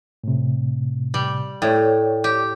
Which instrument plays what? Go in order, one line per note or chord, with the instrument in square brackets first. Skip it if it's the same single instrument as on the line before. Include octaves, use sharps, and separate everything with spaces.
[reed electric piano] A2 C3
[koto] G3
[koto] A2 [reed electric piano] C#5 D5 G5
[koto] G4